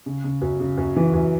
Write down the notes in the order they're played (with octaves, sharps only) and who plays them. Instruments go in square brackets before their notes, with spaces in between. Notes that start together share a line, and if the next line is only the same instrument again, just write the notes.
[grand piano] C#3
C#3
F#2
C#3
F#2
E3
F#2